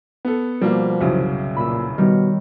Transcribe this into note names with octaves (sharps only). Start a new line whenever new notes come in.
B3 A4
B2 F3 G3 A#3
C2 F#2 C#3
A#2 B5 E6
B2 D#3 G3 C#5